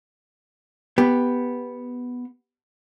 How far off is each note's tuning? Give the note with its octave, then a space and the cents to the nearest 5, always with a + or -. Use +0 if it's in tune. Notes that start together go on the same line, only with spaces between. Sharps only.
B3 +0 G4 +10